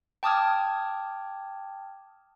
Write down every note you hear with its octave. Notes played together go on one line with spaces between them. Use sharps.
G5 A5 D6 D#6 F6 G#6